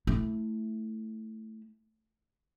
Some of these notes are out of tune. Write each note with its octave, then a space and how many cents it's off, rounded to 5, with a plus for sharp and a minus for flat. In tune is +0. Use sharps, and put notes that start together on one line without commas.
A3 +0 E4 +0